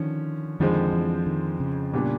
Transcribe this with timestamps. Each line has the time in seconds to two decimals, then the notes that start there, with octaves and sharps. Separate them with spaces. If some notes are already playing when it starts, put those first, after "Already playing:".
Already playing: D3 D#3 F3 C#4
0.60 F2 D3 D#3 F3 G#3 C4
0.93 E3
1.26 D#3
1.60 C#3
1.93 A#2 G3 B3 D4